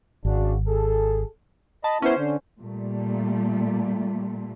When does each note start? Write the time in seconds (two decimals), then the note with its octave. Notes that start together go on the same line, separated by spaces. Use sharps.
0.25 G#1 C#3 D4 F#4
0.67 G#4 A4
1.84 D#5 A5 B5
2.02 B3 C#4 E4 C5
2.17 D3
2.62 A#2 G3 A3